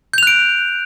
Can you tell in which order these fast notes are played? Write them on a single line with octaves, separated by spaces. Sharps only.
G6 F7 F#6 D7